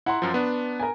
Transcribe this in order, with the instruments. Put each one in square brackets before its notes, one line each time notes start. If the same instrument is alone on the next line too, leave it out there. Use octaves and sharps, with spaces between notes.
[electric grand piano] E4 [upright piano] F#5 A#5 C6
[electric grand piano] F#2 F3
B3 D4
[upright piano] A#4 G#5